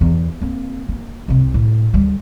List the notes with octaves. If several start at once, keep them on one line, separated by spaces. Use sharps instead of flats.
E2
A#3 C4
A#3
C2 C3
A2
D2 G3